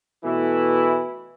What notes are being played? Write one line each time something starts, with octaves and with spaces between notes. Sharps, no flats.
B2 E3 A3 E4